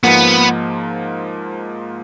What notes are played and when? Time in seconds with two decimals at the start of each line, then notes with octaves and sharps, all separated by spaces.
0.03 G#2 F3 A#3 B3